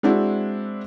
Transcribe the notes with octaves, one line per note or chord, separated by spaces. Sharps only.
G#3 C4 D4 E4 F#4